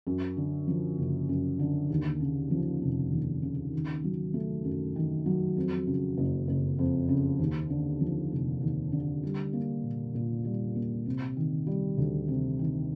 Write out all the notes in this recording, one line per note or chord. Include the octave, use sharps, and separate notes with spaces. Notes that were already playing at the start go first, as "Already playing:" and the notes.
F#2
D3
F3
F#1
F#2
D3
D#2
C#3
F3
F1
D#2
C#3
D#3
F#3
A3
F#2
D#3
F#3
F2
C#3
F#1
F#1
F2
C#3
D#2
D3
F3
F1
D#2
D3
G3
A#3
A#2
A#2
G3
A#3
C3
D#3
G3
D2
C3
D#3